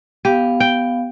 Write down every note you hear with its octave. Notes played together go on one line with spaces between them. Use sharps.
B3 G4 F5
G5